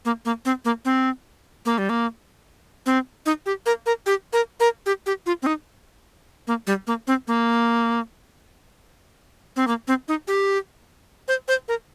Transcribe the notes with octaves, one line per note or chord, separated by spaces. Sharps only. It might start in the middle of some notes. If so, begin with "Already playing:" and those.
A#3
A#3
C4
A#3
C4
A#3
G3
A#3
C4
D#4
G4
A#4
A#4
G4
A#4
A#4
G4
G4
F4
C4
D#4
A#3
G3
A#3
C4
A#3
C4
A#3
C4
D#4
G4
C5
C5
A#4